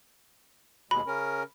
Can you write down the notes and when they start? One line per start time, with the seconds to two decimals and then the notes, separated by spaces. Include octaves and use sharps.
0.91 D#2 B2 G#3 B5
1.07 C#3 C#4 A#4